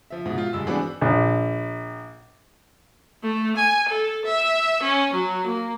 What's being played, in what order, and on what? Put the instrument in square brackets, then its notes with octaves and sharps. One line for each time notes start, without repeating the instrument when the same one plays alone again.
[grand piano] F3 E5
G#2 B2
F4
G2 G#3 E6
E3 B3 C4 D4 F#4 G#4
[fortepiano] A#1
[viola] A3
G#5
A4
E5
C#4
F#3
A#3